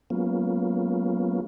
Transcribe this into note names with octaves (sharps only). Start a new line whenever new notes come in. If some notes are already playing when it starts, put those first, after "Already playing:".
F#3 G#3 A#3 B3 C#4 F4